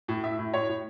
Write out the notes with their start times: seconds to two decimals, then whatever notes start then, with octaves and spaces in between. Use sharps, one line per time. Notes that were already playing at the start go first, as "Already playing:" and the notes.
0.08 A2
0.23 A2 E5
0.39 A2
0.54 A2 C#5
0.69 A2